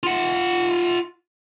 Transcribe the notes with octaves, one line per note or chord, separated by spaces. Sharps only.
F4 F#5